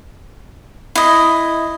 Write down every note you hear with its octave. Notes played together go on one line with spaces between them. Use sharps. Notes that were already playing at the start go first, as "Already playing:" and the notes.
E4 D#5